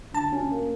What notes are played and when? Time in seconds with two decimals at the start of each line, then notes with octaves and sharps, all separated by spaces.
0.14 D3 A5
0.32 C#4
0.51 A#3